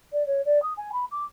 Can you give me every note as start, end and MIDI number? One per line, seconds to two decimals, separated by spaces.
0.12 0.26 74
0.26 0.41 73
0.45 0.61 74
0.62 0.73 87
0.77 0.90 80
0.92 1.05 83
1.11 1.24 86